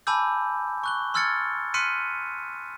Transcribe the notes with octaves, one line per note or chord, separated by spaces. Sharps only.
G#5 A5 B5 D6 E6 G6
C#6 F#6 G7
C6 E6 F6 G#6 A6 C#7
C6 F6 F#6 B6 C#7 D#7